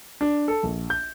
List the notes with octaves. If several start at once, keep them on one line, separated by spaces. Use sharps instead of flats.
D4
A4
A#1
G6